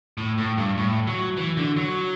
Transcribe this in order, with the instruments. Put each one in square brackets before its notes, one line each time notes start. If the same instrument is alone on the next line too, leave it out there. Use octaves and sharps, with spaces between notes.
[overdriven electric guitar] A2
A2
G2
A2
F#3
E3
D3
F#3